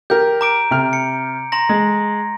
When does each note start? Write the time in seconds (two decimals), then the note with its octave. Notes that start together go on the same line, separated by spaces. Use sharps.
0.10 G4 A#4 G6
0.41 A#5 D6 D7
0.71 C3 F6
0.93 C#7
1.52 A#5 C6 A#6
1.69 G#3